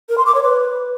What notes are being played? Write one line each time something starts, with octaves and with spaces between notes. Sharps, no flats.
A#4
C6
D6
C#5
B4